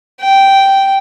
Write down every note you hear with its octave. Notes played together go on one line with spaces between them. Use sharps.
G5